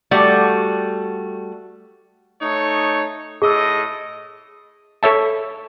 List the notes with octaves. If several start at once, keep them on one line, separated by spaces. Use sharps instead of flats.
G3 A3 F#4
A3 D#4 C#5
A2 G#4 D#5 E6
A4 C#5 E5 A5